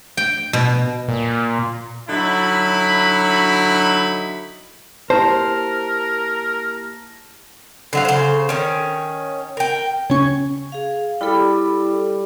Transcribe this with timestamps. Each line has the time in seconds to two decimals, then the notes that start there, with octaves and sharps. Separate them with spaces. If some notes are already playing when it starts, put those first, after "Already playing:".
0.17 G5
0.53 B2
1.08 A#2
2.09 D3 F#3 D#4 E4 B5
5.10 A#3 E4 G4 A#4 C5 A5
7.93 D3 F#3 F5
8.05 C#3 C5
8.49 D#3 C#4
9.57 A#4 G5
10.10 C#3 C#4
10.72 G#4 F5
11.21 G3 E4 A4